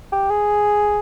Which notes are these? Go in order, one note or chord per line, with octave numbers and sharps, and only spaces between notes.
G4
G#4